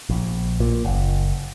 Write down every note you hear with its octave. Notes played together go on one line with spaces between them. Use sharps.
A#1
A#2
F#1